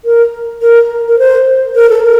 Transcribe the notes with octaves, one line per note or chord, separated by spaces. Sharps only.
A#4
A#4
A#4
C5
A#4
A4
A#4